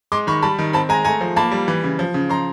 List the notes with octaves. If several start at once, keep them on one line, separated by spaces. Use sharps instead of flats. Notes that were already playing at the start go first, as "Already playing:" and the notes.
G#3 C6 D6
D#3 B5 C#6
G3 A5 B5
D#3
C4 A5 B5
G#3 G#5 A#5
A3 G#5 A#5
F3
A#3 A5 B5
G3
E3
C#3
F3
C#3
F3 A#5 C6